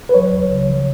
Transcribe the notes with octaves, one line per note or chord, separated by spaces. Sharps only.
B4
F#3 C#5
C#2
C#3
F3